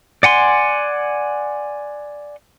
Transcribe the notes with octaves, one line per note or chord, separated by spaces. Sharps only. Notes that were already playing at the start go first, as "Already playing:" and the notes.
D5 F#5 G#5 C6